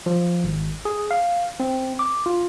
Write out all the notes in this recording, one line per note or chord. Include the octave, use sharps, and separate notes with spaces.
F3
G#1
G#4
F5
C4
D6
F4